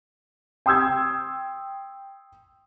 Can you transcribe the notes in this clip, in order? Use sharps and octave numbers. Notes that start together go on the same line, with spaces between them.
G5 C6 D#6 E6 G6 G#6